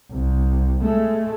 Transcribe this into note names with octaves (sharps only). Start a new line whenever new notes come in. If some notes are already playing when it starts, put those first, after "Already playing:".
C2
G#3 A3